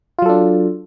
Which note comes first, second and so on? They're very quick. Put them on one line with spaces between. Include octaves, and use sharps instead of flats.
F4 F#3 A4 D4